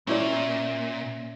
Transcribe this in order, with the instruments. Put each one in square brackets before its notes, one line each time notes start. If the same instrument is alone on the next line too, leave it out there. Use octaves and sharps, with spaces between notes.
[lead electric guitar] A#2 [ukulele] C#4 E4 D5